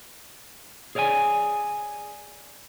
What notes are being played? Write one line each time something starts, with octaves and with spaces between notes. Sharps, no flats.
G#4 C#5 D5 E5 G#5